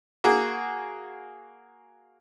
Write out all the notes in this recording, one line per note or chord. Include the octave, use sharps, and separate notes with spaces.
A#3 F#4 G#4